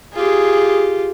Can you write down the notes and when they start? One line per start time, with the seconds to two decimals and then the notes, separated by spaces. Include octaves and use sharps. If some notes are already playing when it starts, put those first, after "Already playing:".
0.15 F4 G4 G#4